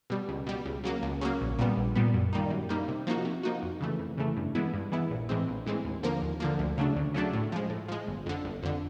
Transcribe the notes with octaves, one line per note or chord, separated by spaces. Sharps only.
B2 G3
C#2
B2 G3
C#2
C#3 F#3 A#3
C#2
C#3 F#3 A#3
A#1
A#2 G3 B3
A#1
A#2 G3 B3
F#2
D#3 G3 A#3 D#4
F#2
D#3 G3 A#3 D#4
C3
F3 A#3 D#4 F#4
C3
F3 A#3 D#4 F#4
F2
C#3 E3 A3
F2
C#3 E3 A3
G2
E3 G#3 B3 E4
G2
E3 G#3 B3 E4
A#1
A2 E3 G#3 C4
A#1
A2 E3 G#3 C4
D#2
D3 F3 A#3
D#2
D3 F3 A#3
D2
C#3 F#3 A3 D4
D2
C#3 F#3 A3 D4
A2
F3 G#3
A2
F3 G#3
G1
F2 D3
G1
F2 D3